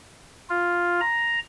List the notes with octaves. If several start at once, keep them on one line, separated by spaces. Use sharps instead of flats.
F4
A#5